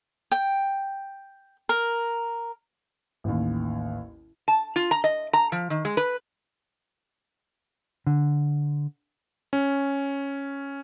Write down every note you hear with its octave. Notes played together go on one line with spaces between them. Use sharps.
G5
A#4
A1 D#2
A5
F4
A#5
D#5
A#5
F3
D#3
G#3
B4
D3
C#4